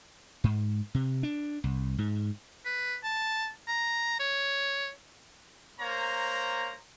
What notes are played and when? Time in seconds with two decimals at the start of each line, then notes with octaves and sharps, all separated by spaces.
0.44 G#2
0.94 C3
1.23 D4
1.64 C2
1.98 G#2
2.65 B4
3.04 A5
3.68 A#5
4.20 C#5
5.79 A#3 C5 C#5 A#5